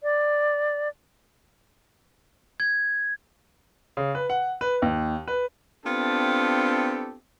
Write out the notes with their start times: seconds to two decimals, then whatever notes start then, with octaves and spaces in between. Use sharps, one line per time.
0.03 D5
2.60 G#6
3.97 C#3
4.15 B4
4.30 F#5
4.61 B4
4.82 D#2
5.28 B4
5.85 B3 C4 D4 F4 G4 A4